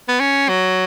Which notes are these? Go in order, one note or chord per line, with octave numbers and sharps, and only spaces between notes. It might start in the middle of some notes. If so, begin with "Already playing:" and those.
B3
C#4
F#3